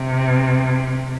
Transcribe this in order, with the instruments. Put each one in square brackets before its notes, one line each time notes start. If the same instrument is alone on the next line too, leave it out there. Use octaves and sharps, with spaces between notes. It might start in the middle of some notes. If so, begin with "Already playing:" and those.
Already playing: [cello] C3